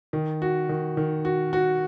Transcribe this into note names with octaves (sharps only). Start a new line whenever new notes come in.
D#3
F#4
D#3
D#3
F#4
F#4